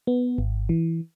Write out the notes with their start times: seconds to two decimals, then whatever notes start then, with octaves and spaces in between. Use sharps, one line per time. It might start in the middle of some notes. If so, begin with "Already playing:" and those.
0.07 B3
0.38 G#1
0.69 E3